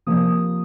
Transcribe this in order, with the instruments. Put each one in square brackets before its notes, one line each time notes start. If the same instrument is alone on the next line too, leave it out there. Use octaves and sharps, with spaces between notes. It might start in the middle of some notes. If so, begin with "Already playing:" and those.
[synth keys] C3 F3 A#3 D#6